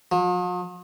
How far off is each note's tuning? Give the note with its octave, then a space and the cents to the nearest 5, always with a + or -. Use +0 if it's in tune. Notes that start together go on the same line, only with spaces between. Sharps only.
F3 +45